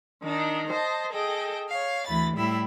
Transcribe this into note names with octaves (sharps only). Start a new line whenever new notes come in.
D#3 D4 D#4
C5 D#5 A5
G#4 A4 D#5 G5
C#5 F5
D2 E3 B5 A6
A2 G3 E4 B5 E6